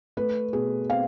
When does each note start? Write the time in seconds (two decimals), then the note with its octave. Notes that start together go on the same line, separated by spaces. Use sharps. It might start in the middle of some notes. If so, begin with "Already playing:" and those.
0.17 A3 B4
0.53 B2 G#4
0.90 C4 F5